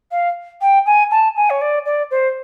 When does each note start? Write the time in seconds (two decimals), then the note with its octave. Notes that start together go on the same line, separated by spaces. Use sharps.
0.11 F5
0.61 G5
0.86 G#5
1.11 A5
1.36 G#5
1.50 C#5
1.61 D5
1.85 D5
2.11 C5